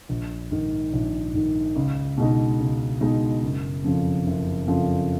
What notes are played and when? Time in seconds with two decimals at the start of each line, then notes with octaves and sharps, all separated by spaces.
0.09 A#1
0.51 G#2 D#3
0.93 A#1
1.34 G#2 D#3
1.76 C#2
2.17 B2 G#3 D#4
2.60 C#2
3.01 B2 G#3 D#4
3.43 F#1
3.84 F2 C#3 F3
4.26 F#1
4.67 F2 C#3 F3